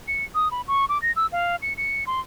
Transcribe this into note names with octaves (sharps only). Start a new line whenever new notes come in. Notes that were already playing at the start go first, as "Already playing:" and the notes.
C#7
D#6
B5
C#6
D6
A#6
E6
F5
C#7
C#7
C6